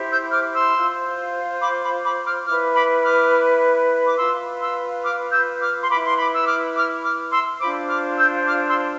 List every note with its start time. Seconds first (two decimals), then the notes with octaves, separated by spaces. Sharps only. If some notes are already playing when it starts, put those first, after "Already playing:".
Already playing: E4 G4 C5
0.11 E6 G6
0.32 D6 F6
0.54 C6 E6
0.75 F4 C5
1.61 B5 D6
1.82 B5 D6
2.04 B5 D6
2.25 D6 F6
2.46 E4 B4 D6 F6
2.75 B5 D6
3.04 D6 F6
4.06 D6
4.17 F4 B4 C6 E6
4.61 C6 E6
5.03 D6 F6
5.32 E6 G6
5.61 D6 F6
5.81 C6
5.89 E4 B4 B5 D6
6.07 C6
6.17 B5 D6
6.34 E6
6.46 D6 F6
6.75 D6 F6
7.03 D6 F6
7.31 C6 E6
7.60 D4 F4 C5 B5 D6
7.88 D6 F6
8.17 E6 G6
8.46 D6 F6
8.67 C6 E6